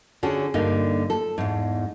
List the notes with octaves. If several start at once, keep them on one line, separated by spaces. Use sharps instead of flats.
D3 C#4 F#4 G#4 A4
G2 D3 A#3 D#4
A4
E2 G#2